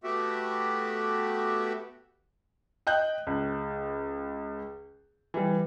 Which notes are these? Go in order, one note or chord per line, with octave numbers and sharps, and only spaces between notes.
A3 B3 F#4 G4 E5
D#5 G5 F#6 G6
C#2
E3 G3